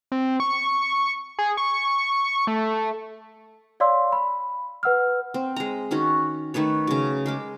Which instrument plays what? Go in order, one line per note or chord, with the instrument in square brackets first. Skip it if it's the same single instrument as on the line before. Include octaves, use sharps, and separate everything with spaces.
[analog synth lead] C4
C#6
G#4
C#6
A3
[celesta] C#5 D5 F5 C6 E6
B5
B4 F#5 E6 F6
[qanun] C4
G#3 A#5
D#3 C#4 F#4
D#3 A3 B4 C#5
C#3 F#3
G#3 A#4 D6